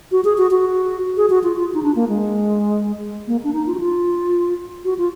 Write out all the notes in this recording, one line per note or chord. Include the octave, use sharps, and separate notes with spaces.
F#4
G#4
F#4
F#4
G#4
F#4
F4
F4
D#4
D4
A#3
G#3
A#3
D4
D#4
F4
F#4
F4
F#4
F4